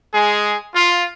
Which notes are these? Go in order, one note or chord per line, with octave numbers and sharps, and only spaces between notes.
G#3 G#4
F4